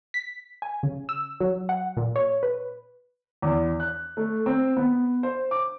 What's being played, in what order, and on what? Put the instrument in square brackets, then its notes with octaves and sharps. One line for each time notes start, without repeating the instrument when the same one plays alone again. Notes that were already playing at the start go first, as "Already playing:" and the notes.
[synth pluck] B6
G#5
C#3
E6
F#3
F#5
A#2
C#5
B4
[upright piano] E2
F#6
A3
C4
B3
C5
D6